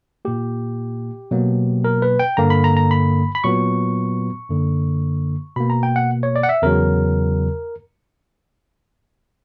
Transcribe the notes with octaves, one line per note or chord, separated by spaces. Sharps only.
A#2 A#3 G4
B2 F#3 A#3
A#4
B4
G5
G2 D3 A#3 A#5
B5
A#5
A#5
B5
B5
A#2 F#3 B3 C#6
F#2 D3 A#3
B2 A#3 B5
A#5
G5
F#5
C#5
D5
F#5
E5
E2 C#3 F#3 A#4